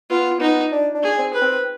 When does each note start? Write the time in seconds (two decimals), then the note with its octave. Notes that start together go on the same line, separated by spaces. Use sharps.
0.10 B3 F4
0.40 B3 D#4
0.72 D4
0.95 D4
1.03 G#4
1.18 C4
1.34 B4
1.41 C4